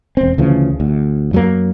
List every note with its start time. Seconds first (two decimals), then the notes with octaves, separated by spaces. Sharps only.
0.17 E1 C4
0.38 D2 C#3 E3 F3
0.80 D2
1.33 F#2 F#3 G3 A#3